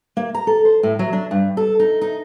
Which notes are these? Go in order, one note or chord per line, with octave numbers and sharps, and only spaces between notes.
A#3
A#5
A4
C5
A2
F#3
D4
G2
A4
D#4
D#4